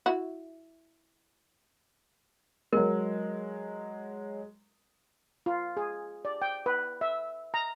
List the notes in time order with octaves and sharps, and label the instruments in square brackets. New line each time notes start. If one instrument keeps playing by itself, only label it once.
[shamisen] E4 F#4
[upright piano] F#3 G#3 [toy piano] A#4
[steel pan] F4
G#4
D5
G5
B4
E5
A#5